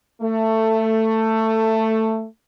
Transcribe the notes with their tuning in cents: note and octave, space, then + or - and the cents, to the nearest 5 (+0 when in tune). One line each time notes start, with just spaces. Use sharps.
A3 +15